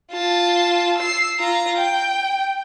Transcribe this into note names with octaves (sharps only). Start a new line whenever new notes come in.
F4 A5
E6 C7
F4 A#5
G5